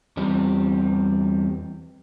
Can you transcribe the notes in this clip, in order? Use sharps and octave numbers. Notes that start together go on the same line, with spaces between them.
E2 G3 C4